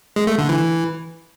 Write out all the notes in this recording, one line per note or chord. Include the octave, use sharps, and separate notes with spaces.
G#3
A3
D3
E3